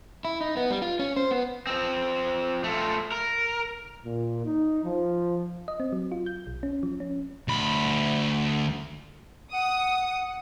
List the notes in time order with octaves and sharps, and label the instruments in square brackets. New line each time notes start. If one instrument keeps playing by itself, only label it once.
[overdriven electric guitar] E4
D#4
B3
G3
F4
C#4
C5
B3
F3 C4
A3 F4
A#4
[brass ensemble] A#2
D#4
F3
[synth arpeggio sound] D#5
C4
F#3
F4
G6
B1
C#4
F3
C#4
[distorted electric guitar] D2 B5
[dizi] F#5 [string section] D#6